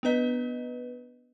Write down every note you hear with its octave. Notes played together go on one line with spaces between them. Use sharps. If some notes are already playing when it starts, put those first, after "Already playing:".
B3 D4 B4 D#5